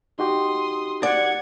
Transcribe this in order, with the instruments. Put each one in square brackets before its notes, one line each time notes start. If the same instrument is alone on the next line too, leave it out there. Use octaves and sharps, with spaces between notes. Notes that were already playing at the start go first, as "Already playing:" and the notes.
[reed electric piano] D#4 F#4 G4 [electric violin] C6 D#6
[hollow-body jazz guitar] D5 [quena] F#5 [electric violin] G#6